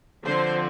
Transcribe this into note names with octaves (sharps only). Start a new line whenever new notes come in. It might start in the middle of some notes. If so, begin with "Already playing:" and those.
D3 F3 C4 C5